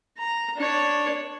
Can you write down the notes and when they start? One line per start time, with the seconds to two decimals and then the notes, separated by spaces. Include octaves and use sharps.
0.18 A#5
0.57 D4 C#5